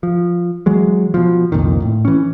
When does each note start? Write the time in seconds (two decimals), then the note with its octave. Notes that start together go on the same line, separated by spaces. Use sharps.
0.03 F3
0.66 E3 F#3 G#3
1.14 B2 F3
1.52 C2 F2 A#2 D#3
1.82 A2
2.05 E3 C#4